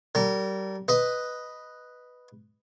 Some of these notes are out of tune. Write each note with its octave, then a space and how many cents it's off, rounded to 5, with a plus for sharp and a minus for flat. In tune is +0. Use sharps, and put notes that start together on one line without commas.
G3 -30 A#4 -30
B4 +0 D#5 +0